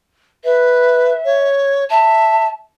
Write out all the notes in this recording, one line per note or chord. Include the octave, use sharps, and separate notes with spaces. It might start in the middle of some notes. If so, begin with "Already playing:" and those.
B4 E5
C#5
E5 A5